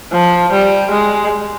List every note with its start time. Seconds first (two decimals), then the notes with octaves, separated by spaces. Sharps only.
0.12 F3
0.52 G3
0.91 G#3